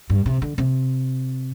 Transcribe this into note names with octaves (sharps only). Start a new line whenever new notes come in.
G2
C3
D3
C3